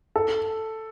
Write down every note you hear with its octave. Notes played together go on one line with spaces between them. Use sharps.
A4